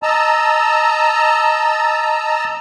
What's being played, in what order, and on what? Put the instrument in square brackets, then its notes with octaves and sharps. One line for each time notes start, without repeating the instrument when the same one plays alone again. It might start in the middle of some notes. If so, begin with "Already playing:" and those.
[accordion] D#5 A5 A#5 E6